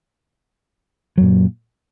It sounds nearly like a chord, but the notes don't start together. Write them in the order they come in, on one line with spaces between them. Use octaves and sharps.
F#3 F#2 A#2